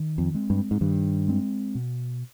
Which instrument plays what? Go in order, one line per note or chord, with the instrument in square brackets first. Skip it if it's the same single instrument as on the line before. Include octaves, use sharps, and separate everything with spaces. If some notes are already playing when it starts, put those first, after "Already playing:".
Already playing: [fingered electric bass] D#3
[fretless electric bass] F2
[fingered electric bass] G#3 C4
[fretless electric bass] G2
G#2
[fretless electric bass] G2 [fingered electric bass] D#3
[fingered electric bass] G#3 C4
B2